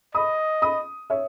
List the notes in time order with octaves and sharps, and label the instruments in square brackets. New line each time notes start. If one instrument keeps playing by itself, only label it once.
[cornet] D#5 [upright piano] B5 D#6
[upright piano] B5 D#6
C#5 E5